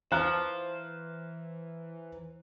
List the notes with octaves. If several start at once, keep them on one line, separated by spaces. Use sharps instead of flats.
E3 C5 F5 A#5 F#6